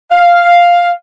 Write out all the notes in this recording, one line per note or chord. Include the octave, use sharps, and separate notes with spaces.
F5